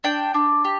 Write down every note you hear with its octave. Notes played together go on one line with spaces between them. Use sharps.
D4 G5
D4
G4